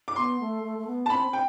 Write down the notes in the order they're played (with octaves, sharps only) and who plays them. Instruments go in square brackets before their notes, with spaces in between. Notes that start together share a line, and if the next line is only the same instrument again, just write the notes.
[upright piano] D6
[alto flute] B3 [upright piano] C6
[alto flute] A3
A3
A3
B3
[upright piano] A5
[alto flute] C4 [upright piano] B5
[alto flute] C4
[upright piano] G5